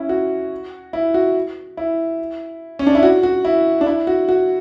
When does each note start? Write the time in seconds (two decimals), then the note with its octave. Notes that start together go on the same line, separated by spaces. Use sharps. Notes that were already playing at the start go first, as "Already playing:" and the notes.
Already playing: C#4 E4
0.09 F#4
0.93 E4
1.14 F#4
1.77 E4
2.79 C#4
2.87 D4
2.95 E4
3.03 F#4
3.23 F#4
3.45 E4
3.81 D4
3.86 E4
4.07 F#4
4.29 F#4